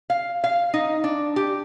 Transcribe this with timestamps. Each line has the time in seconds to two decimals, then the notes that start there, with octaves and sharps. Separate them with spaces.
0.10 F5
0.44 F5
0.74 D#4
1.04 D4
1.36 G4